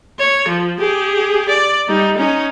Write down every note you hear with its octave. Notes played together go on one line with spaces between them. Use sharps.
C#5
F3
G4 G#4
D5
G3 D#4
C#4 D#4